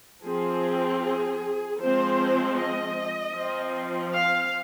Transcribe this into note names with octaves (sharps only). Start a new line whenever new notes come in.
F3 C4 G#4
G#4
F3 G#3 C4 C5
D#5
F3 C4
F5